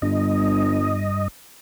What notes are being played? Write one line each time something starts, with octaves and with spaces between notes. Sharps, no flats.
G1 G2 D#5